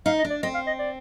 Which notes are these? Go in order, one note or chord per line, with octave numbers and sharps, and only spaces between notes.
D#4 F5
D#5
D4
D5
C4 D#5
F5
D#5
D5